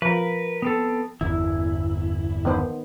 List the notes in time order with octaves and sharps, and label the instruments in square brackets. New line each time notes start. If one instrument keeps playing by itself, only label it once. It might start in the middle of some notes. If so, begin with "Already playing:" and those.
[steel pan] F3 [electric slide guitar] A#4 B4
[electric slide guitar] B3 C4 A4
[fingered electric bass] G1 E2 E3 [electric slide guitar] E4
[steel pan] D#3 B3 C5